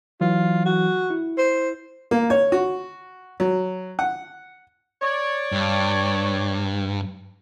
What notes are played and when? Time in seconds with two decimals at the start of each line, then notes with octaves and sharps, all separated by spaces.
0.21 E3 F#3 F4
0.65 F#4
1.10 E4
1.38 C5
2.11 A#3
2.30 C#5
2.52 F#4
3.40 F#3
3.99 F#5
5.02 C#5 D5
5.52 G2